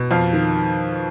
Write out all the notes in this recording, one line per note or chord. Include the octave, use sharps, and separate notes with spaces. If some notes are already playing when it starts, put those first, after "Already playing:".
Already playing: B2
F2 F5
D#3